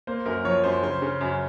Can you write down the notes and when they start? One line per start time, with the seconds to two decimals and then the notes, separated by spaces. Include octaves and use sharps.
0.07 A#3 C5
0.26 F#2 A#4
0.45 F3 C#5
0.64 F#2 C5
0.83 C#3 C5
1.02 C#3
1.21 F#2